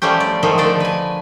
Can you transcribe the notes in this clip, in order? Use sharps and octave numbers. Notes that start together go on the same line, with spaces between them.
F3 G3 A3 C#4 G4
D5
D#3 F3 G#3 A3
D3 A3 D4 A4 D5
B4 G#5